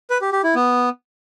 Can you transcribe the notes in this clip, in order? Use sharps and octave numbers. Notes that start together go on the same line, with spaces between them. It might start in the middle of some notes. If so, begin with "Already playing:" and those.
B4
G4
G4
E4
B3